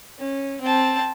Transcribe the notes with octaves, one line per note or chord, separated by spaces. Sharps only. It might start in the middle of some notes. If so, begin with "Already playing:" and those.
C#4
C4 A5